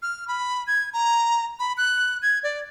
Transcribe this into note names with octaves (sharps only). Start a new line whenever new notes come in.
F6
B5
G#6
A#5
B5
F#6
G#6
D5